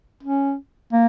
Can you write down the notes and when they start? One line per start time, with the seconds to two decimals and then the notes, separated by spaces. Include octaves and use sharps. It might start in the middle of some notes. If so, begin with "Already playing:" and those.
0.23 C#4
0.92 A#3